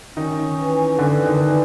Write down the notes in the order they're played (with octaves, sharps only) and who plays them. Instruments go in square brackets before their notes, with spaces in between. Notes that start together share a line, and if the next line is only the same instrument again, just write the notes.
[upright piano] D#3 D#4 [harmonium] C#4
[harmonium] E3
[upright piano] D3 D4 [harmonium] E3
[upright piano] D#3 D#4
[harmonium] E3